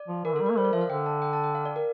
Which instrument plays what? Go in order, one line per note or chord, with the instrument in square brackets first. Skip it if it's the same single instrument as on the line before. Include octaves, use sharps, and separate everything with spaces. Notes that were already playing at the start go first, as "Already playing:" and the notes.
Already playing: [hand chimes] D5
[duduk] F3
[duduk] E3 [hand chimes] A#4
[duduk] D3
[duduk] G3 [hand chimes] A4
[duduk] A#3 [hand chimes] A#4
[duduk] G3 [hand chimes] C5
[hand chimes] D5
[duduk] F3 [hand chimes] E5
[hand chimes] F5
[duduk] D3 [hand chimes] G5
[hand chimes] A5
G5
A5
G5
F5
D5
A#4